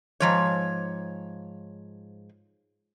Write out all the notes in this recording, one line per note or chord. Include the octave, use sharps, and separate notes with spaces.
G#2 F3 C#5